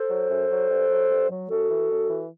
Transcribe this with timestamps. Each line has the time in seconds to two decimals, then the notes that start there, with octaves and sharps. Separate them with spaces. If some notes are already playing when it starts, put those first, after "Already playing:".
Already playing: A4 C5
0.09 F#3
0.29 F#2
0.49 F#3
0.69 G2
0.89 F#3
1.09 G2
1.29 F#3
1.49 F#2 F#4 A4
1.70 E3
1.89 F#2
2.10 E3